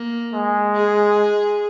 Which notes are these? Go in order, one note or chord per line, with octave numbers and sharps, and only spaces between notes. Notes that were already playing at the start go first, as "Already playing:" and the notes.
Already playing: A#3
G#3
G#4